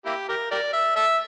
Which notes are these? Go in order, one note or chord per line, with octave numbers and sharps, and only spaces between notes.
A#3 E4 G4
G4 A#4
G4 A#4 D5
E5
A4 E5